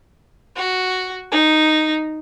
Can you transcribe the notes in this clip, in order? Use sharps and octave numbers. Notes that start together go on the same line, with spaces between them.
F#4
D#4